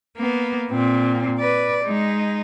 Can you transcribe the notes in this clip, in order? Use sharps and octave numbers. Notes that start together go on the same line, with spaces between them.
A#3 B3
A#2 C4
B4 D5
G#3 D#4